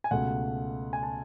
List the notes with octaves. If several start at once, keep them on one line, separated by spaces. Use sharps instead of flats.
G#5
C#2 B2 A3 F#5
G#5
A5